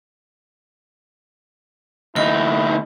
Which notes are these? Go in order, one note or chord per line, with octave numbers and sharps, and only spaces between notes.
D2 D#4 E4 D#5